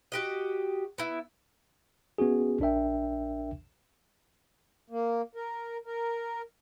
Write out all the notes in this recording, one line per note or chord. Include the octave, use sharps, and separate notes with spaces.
F#4 G4 D#5
B3 E4
B3 C#4 F#4 G#4
A#1 D4 A#4 E5 G5
A#3
A#4
A#4